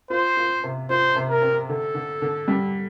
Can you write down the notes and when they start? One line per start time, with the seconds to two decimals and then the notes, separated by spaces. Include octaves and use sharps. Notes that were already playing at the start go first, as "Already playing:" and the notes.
0.10 F4 C5
0.37 F4
0.64 C3
0.90 F4 C5
1.16 C3
1.29 A#4
1.42 C4
1.69 D3 A4
1.94 D3
2.22 D3
2.48 G3